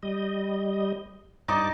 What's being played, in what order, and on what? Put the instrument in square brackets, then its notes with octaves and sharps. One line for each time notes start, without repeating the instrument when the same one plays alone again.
[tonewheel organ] G3 D#5
[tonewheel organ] G2 A5 D6 [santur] D#4 D5 D#5